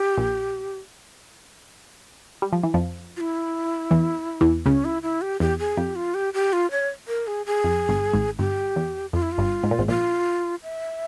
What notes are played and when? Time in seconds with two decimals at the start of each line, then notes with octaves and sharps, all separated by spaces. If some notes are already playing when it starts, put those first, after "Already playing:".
Already playing: G4
0.18 A#1 A#2
2.42 G3
2.53 F3
2.63 E3
2.74 F2 F3
3.17 F4
3.21 E4
3.91 E2 E3
4.41 E2 E3
4.66 C#2 C#3 C#4
4.85 E4
5.02 E4
5.22 G4
5.40 E2 G4
5.59 G#4
5.77 F2 G4
5.96 F4
6.14 G4
6.34 G4
6.53 F4
6.71 C#5
7.08 A#4
7.27 G#4
7.46 G#4
7.64 F2
7.89 G1 G2
8.13 G#1 G#2
8.39 G1 G2 G4
8.76 E2
9.13 F2 F4
9.22 E4
9.32 F4
9.38 G1 G2
9.64 G#2
9.71 A#2
9.79 G#1 G#2
9.88 A#1 A#2 F4
10.63 E5